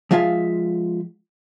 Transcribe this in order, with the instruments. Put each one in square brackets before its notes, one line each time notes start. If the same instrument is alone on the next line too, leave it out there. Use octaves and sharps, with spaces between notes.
[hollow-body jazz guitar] F3 G#3 F4 E5 F5